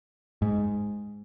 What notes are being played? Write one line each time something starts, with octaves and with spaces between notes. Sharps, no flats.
G#2